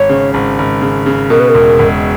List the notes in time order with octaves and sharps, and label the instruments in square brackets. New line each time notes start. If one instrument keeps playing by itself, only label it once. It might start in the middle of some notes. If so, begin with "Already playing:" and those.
Already playing: [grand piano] G#1 [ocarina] C#5
[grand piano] C#3
G#1
G#1
C#3
C#3
[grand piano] B2 [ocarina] A#4
[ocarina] B4
A#4
[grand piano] E1
E1